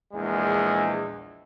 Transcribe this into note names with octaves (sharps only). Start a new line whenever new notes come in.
A#1 E2 G#3